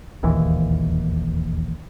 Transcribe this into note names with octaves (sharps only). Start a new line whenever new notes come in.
E1 A#1 D#2 E3